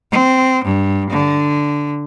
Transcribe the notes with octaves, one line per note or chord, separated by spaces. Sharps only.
C4
G2
D3